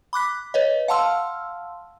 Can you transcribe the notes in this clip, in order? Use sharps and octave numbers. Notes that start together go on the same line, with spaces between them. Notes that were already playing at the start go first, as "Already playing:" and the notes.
B5 D6 F#6 B6
B4 C#5 D#5
F5 F#5 A5 C6 E6 F6